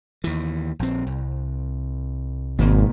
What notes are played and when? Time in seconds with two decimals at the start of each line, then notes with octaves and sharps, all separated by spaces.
0.24 D#2 E3
0.79 A#1 C4
1.07 C2
2.59 G#1 B2 A#3 B3